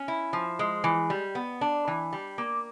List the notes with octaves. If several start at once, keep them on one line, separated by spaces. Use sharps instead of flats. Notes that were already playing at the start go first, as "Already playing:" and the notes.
Already playing: C#4
E4
F3
G#3
E3
G3
B3
D4
E3
G3
A#3